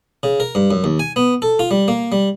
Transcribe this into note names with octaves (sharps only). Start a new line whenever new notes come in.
C#3
A#4
G2
F#2
D#2
G#5
B3
A4
F4
G3
A#3
G3